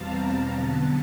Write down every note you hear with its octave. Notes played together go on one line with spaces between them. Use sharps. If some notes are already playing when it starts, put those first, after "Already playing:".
Already playing: E2 B2 G3 C4 F5 A5 A#5
D3 F#3 B3 A5